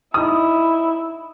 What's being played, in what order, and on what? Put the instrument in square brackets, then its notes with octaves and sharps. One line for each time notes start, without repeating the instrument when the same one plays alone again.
[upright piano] D#4 D#6 [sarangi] E4